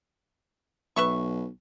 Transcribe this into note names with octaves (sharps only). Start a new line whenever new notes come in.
B1 B4 E5 C#6